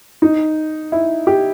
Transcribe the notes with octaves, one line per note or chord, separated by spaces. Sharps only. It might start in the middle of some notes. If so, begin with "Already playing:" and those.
D#4
E4
G4